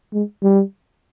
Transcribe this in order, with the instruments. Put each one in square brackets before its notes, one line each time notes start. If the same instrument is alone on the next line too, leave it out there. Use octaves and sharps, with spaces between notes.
[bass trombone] G#3
G3